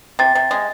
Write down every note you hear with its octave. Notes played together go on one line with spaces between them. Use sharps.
C3 A6
C3
G#3